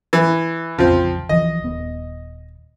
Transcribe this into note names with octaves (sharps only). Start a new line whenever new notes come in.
E3
A#1 F2 C#3 F3 C4
C2 E3 F3 D#5
D#1 B3